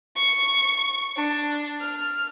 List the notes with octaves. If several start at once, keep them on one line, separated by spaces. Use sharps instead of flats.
C#6
D4
F6